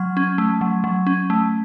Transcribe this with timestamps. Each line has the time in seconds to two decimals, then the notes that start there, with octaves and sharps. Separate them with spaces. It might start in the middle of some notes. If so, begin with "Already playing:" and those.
Already playing: F#3 F6
0.17 C#4
0.38 A3
0.61 F#3
0.84 F#3
1.07 C#4
1.30 A3